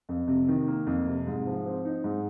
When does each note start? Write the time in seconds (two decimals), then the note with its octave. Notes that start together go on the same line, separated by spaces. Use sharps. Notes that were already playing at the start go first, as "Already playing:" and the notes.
0.09 F2
0.28 C3
0.48 D#3
0.68 A#3
0.86 F2
1.07 C3
1.27 G#2
1.46 F3
1.66 C4
1.85 D#4
2.04 G#2